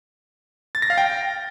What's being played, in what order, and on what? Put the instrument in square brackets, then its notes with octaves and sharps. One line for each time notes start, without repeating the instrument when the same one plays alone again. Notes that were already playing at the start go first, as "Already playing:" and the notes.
[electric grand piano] A6
A#6
F5
G5